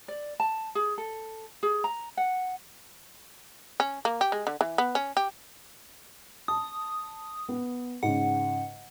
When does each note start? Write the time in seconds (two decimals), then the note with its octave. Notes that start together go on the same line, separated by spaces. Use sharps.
0.08 D5
0.40 A5
0.75 G#4
0.98 A4
1.63 G#4
1.84 A#5
2.17 F#5
3.80 C#4
4.05 A#3
4.21 G4
4.32 G#3
4.47 D3
4.61 E3
4.78 B3
4.95 C#4
5.17 G4
6.48 A5 D#6
7.49 B3
8.03 G#2 C#3 F#5